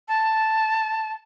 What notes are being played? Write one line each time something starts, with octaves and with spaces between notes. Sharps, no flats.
A5